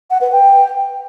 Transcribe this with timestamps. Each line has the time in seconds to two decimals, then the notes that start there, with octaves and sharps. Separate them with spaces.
0.10 F#5
0.21 B4
0.32 G5